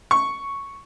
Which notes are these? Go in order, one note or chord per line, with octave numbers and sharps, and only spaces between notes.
C#6